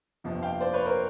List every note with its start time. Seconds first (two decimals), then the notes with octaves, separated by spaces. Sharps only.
0.24 G1 F2 C3 F3
0.42 F5 G5
0.60 C5 D5
0.73 B4 C#5
0.85 A#4 C5